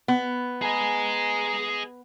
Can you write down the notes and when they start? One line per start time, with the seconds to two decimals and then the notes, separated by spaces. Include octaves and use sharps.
0.08 B3
0.62 G#4 D#5 G#5 A#5